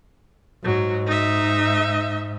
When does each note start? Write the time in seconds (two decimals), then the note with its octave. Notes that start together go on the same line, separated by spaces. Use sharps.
0.64 G#2 F#3
1.06 D#4 E5